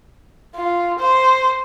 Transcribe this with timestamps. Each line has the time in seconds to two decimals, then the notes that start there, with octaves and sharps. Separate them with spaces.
0.55 F4
0.99 C5